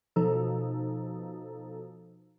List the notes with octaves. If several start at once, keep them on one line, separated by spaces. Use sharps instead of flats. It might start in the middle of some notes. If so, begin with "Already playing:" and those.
B2 F3 D#4 A4